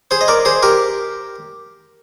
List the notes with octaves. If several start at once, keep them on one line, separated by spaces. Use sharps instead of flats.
G#4 C5
D#5
A#4 D5
G#4 C5
G4 A#4